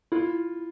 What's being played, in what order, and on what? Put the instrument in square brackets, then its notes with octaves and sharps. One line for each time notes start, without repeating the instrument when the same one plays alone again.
[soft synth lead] E4 [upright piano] F4